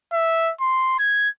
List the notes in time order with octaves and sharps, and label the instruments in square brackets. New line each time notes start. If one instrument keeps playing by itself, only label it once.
[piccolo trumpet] E5
C6
G#6